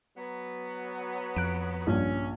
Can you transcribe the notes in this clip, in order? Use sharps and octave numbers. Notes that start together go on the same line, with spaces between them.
F#3 B3
F2 F#6 D7
A#1 G2 C#4